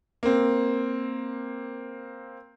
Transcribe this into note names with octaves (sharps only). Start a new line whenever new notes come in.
A#3 C4